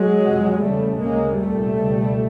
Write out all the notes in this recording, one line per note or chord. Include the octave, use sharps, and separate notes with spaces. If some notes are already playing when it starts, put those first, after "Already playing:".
Already playing: F#3 G#3
F2 C3
E2 C#3 G3 A3
D2 C#3 G#3 A#3
C2 A#2 G3 A3
C#2 B2